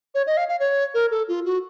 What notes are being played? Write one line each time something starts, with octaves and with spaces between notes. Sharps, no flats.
C#5
D#5
F5
F5
C#5
A#4
A4
F4
F#4